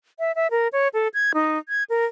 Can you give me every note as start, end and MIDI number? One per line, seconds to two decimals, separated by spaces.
0.19 0.32 76
0.35 0.47 76
0.51 0.68 70
0.73 0.88 73
0.94 1.08 69
1.14 1.32 92
1.34 1.58 63
1.69 1.84 92
1.90 2.05 70